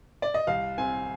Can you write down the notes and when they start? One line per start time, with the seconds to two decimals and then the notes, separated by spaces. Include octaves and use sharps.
0.22 D5
0.34 D#5
0.47 C2 F5
0.78 C4 G#5